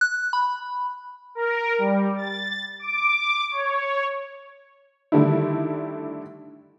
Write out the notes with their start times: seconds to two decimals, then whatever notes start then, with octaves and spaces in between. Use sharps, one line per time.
0.01 F#6
0.33 B5
1.35 A#4
1.79 G3
2.16 A6
2.79 D6
3.50 C#5
5.12 D3 D#3 G3 A3 D4 E4